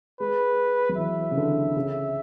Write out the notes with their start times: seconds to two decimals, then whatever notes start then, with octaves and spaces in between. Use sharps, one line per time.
0.20 G#3 B4
0.89 F#3
0.97 E3 E5
1.31 C#3
1.37 D3
1.76 C#3